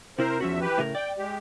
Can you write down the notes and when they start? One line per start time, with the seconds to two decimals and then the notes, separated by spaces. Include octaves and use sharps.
0.19 C3 E4 A#4 C5
0.40 E2 F3 C#4 F#4 E5
0.61 E3 G4 B4
0.78 A2 C#3 A#4
0.95 D5 G5
1.18 G#3 G4